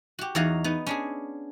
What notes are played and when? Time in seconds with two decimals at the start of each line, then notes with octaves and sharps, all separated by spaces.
0.19 F#4 G4
0.35 E2 D#4 F#4 C#5 F5 A#5
0.64 B3 D#4
0.87 C#4 D4 G#4